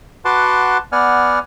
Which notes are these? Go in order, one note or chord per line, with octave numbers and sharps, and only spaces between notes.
F#4 B4 F#5 A5 C6 D6
B3 D5 F#5 G#5 F6